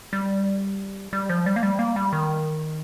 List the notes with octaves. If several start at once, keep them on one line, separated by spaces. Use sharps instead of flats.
G3
G3
F3
G3
A#3
G3
A#3
G3
D#3